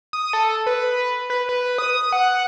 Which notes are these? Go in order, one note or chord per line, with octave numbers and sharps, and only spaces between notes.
D#6
A4
B4
B4
B4
D#6
F#5